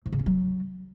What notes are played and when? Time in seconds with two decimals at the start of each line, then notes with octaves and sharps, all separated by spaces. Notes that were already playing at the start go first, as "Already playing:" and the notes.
0.06 G#2
0.12 C#3
0.19 C#4
0.26 F#3